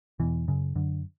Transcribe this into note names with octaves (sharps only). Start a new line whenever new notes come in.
E2 B2 E3
F#2 C#3
F#2 D3